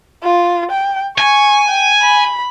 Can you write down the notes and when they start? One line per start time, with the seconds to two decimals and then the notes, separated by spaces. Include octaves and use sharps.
0.23 F4
0.71 G5
1.18 G#5 C#6
1.69 G5
2.01 B5